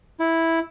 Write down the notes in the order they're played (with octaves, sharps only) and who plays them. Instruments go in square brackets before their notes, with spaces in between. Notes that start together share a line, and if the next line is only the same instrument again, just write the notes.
[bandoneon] E4